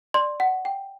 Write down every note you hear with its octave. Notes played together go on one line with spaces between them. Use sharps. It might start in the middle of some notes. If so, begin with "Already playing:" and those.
D5 C6
F#5
G5